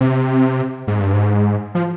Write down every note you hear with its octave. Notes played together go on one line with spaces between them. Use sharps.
C3
G#2
G2
G#2
F3